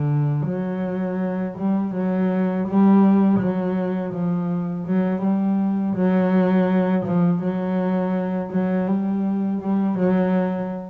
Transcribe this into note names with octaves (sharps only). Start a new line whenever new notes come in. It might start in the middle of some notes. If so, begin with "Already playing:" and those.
Already playing: D3
F#3
G3
F#3
G3
F#3
F3
F#3
G3
F#3
F3
F#3
F#3
G3
G3
F#3